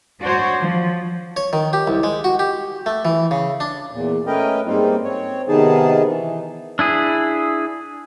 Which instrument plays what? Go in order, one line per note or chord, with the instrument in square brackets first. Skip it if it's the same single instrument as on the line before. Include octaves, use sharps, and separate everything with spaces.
[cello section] D4 F#4 C5 C#5
F3
[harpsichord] C#5
D#3
G4
C2
G#3
F#4
G4
A3
E3
C#3
D4
[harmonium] E2 A#2
A3 C#4 A#4 B4 D#5 G5
G#2 G3 A#3 C4 D#4 F4
C4 C#5
C3 D#3 B3 D#4 G#4 A5
E3
[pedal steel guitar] D4 E4 G#4